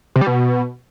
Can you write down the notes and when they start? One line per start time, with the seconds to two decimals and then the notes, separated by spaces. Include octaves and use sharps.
0.16 C3
0.21 G3
0.27 B2